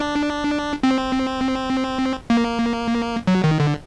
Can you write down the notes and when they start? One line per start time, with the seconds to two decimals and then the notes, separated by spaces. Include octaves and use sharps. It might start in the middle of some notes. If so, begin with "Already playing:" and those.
Already playing: D4
0.83 C4
2.30 A#3
3.27 F#3
3.44 D#3
3.60 D3